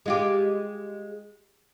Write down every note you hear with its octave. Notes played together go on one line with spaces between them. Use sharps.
G#3 F4 G4